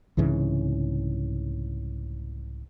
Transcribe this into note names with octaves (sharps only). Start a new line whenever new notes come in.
C2 G#2 C#3 E3